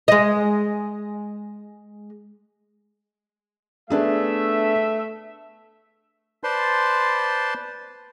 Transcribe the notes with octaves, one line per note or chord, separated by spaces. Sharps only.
G#3 D#5
A3 B3 D4 G#4 E5
B4 C5 D5 A5 C6